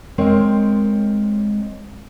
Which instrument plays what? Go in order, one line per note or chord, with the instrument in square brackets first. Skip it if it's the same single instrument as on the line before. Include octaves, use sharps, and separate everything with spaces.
[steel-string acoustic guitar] G#3 C4 A#4 C#5